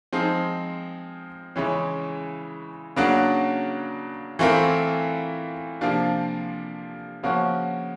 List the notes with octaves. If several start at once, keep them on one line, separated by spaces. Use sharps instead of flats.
F3 G#3 C4 D#4 G#4
C#3 E3 G#3 C#4
C#3 F#3 A#3 D4 F#4
E3 A3 C4 F4 A#4
C3 F3 A#3 D4 F4
C#3 F3 A#3 C#4 F#4